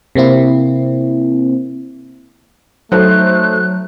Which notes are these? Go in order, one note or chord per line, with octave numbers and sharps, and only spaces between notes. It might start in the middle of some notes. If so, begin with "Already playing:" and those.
C3 A#3 C4 E4
F#3 A3 D#4 A4 C5 F#6